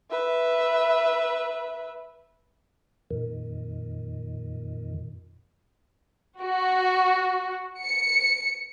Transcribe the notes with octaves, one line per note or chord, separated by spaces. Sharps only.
B4 E5
F2 A#2 D#3
F#4
C#7